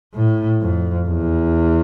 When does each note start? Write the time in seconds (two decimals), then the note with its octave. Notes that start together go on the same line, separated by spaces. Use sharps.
0.14 A2
0.61 F2
1.08 E2